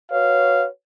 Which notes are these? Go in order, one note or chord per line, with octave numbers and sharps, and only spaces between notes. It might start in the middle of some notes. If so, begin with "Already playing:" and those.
F#4 B4 C#5 F5